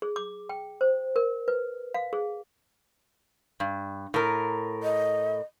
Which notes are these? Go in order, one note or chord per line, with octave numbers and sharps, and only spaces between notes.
G#4
D6
G5
C5
A#4
B4
F5
G#4
G2
A2 A#4
D#5